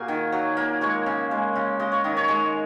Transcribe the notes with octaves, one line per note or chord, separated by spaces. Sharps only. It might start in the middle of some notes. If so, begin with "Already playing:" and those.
Already playing: A#2 A#3 F#4 G#4
D#3
F#3
A#3
G#3 C#5
C#3
G#3
C#3
G#3 D#5
C#5
D#3 D#5
C#5
G#3